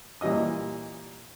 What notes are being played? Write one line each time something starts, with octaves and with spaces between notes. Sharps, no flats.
A#2 E3 G3 D#5 D#6